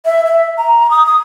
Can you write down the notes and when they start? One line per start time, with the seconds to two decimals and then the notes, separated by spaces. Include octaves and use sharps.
0.05 E5
0.26 E5
0.57 A#5
0.91 D#6
1.06 D#6